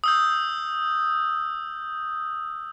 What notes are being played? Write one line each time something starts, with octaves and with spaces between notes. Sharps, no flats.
D#6 E6 G6